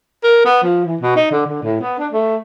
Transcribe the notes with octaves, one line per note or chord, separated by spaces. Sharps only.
A#4
B3
F3
E3
B2
D#4
D3
D3
A2
B3
D4
A3